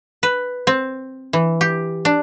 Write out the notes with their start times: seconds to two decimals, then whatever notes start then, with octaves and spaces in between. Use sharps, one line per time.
0.23 B4
0.67 C4
1.33 E3
1.61 G4
2.05 D4